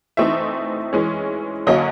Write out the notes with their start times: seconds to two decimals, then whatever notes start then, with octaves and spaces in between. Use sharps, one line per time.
0.17 E3 A3 C4 D#4 E5
0.93 E3 G#3 C#4
1.67 D3 F#3 A#3 C#4 D#5